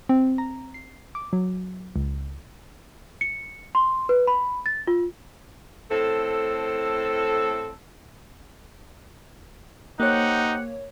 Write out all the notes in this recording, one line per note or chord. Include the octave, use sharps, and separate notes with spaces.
C4
A#5
C7
D6
F#3
C#2
C#7
C6
B4
B5
A6
F4
A2 C4 A4
A#3 D#4 G4 C5 C#5 F#5